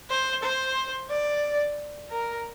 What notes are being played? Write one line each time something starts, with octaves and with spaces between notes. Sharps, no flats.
C5
C5
D5
A#4